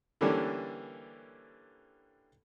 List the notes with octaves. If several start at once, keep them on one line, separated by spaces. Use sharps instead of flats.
D3 E3 G3 A#3 C#4 D4